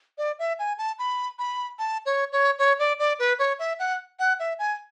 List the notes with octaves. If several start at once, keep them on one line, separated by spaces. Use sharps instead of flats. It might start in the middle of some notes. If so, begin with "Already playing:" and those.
D5
E5
G#5
A5
B5
B5
A5
C#5
C#5
C#5
D5
D5
B4
C#5
E5
F#5
F#5
E5
G#5